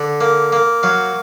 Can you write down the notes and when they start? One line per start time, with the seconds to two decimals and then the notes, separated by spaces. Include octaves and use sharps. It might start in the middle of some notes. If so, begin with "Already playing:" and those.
Already playing: D3
0.21 A#3
0.52 A#3
0.83 F#3 F5